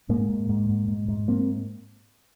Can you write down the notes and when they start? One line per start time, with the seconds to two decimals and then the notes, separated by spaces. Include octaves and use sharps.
0.09 G#2 G#3 A#3
0.29 G#2
0.49 G#2
0.69 G#2
0.88 G#2
1.08 G#2
1.28 A#3 C4